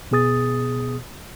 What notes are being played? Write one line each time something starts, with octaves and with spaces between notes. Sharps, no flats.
B2 B3 G#4 D#6 A6